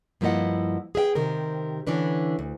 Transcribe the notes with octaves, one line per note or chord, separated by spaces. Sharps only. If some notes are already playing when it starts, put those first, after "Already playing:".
G2 F3 A#3 E4 D#5 F#5
G#4 B4 E5 G5
C3 D#3 G4 A#4 C5
D3 E3 C#4 D4 B4
D2